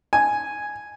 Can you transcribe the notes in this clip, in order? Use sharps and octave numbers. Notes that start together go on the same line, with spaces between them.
G#5